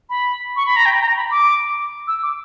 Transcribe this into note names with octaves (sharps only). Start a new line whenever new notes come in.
B5
C#6
B5
A#5
G5
A#5
B5
D6
E6
D6